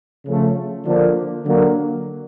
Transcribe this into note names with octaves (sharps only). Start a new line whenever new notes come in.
C#3 F3 A3
D3 F3 A#3 D4
D3 F#3 A#3